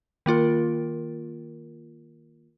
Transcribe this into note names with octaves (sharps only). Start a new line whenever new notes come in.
D#3 A#3 F4 A#4